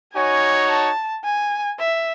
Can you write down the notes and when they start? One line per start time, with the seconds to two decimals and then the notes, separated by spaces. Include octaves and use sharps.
0.13 D#4 F#4 C#5 G#5
0.69 A5
1.24 G#5
1.79 E5